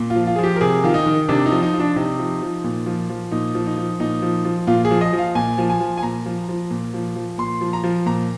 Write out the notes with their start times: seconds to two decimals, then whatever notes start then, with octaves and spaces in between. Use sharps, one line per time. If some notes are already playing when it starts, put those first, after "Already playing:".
Already playing: A#2
0.10 F4
0.16 F3
0.27 F4
0.36 F3 G#4
0.44 G4
0.56 A#4
0.61 C3 G#4
0.84 D#3 F4
0.94 D#4
1.06 D#3
1.28 C3 D4
1.46 D#4
1.52 F3
1.63 D#4
1.73 F3
1.80 D4
1.96 C3 D#4
2.19 F3
2.42 F3
2.64 A#2
2.86 F3
3.09 F3
3.32 A#2 D#4
3.55 F3
3.66 D#4
3.77 F3
4.00 A#2 D#4
4.22 F3
4.45 F3
4.67 A#2 F4
4.85 G#4
4.91 F3
5.01 D#5
5.13 F3
5.19 F5
5.35 A#2 G#5
5.58 F3
5.69 G#5
5.80 F3
5.97 G#5
6.03 A#2 A#5
6.26 F3
6.49 F3
6.71 A#2
6.94 F3
7.16 F3
7.38 A#2 C6
7.61 F3
7.73 A#5
7.84 F3
8.06 A#2 A#5